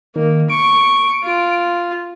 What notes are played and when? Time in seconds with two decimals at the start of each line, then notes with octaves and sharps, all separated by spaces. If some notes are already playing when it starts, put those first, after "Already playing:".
0.16 D#3 A#3
0.50 C#6 D7
1.23 F4